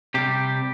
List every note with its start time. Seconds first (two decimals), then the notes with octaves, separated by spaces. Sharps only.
0.14 C3 G3 G4